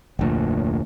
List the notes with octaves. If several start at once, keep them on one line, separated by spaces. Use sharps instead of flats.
F1 D2 A#2